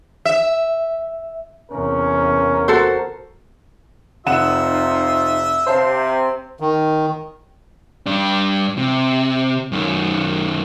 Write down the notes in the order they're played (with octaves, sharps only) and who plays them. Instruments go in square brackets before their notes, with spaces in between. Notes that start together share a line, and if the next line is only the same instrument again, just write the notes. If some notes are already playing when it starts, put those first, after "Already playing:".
[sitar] E5
[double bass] E2 C3 [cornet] C#4 [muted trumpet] A#4
[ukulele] F#4 A4 C5
[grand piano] F1 F#5 E7 [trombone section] C3 D#4 F4 [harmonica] D#5 E5
[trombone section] C3 [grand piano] C5 F5 A5 [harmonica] C6
[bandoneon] D#3
[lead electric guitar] G2 D4
C3
F#2 D#3